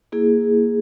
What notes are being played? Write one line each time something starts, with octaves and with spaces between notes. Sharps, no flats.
A#3 E4 G#4